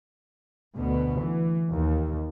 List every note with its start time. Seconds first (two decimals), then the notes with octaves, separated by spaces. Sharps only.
0.76 D2 B2 B3
1.23 E3
1.71 D#2